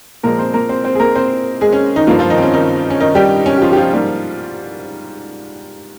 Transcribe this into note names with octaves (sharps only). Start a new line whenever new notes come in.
A#2 F3 G#3 A#3 A#4
C4 C5
A#3 A#4
C4 C5
C4 C5
G#4
A#3 A#4
C4 C5
G#3 G#4
C#4
D#3 D#4
G2 F3 A#3 F4
F3 F4
D#3 D#4
C4
C#4
D#3 D#4
C#4
D#3 D#4
G3 G4
C#4
G4
F3 F4
G4
F3 F4
G#2 G3 A#3